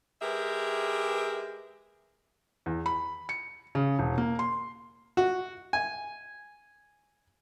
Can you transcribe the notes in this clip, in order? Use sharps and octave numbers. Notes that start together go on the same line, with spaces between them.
G#3 G4 G#4 A#4 B4 E5
E2
B5
C#7
C#3
E1
A#3
C6
F#4
G#5